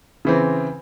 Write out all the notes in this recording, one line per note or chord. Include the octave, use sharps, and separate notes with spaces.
C#3 E3 C4